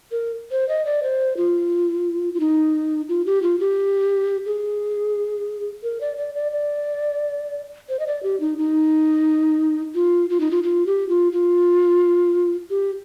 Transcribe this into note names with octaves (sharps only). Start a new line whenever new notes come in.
A#4
C5
D#5
D5
C5
F4
F4
D#4
F4
G4
F4
G4
G#4
A#4
D5
D5
D5
D5
C5
D#5
D5
G4
D#4
D#4
F4
F4
D#4
F4
F4
G4
F4
F4
G4